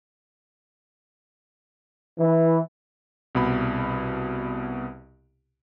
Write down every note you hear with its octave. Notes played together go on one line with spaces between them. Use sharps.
E3
C2 B2 B5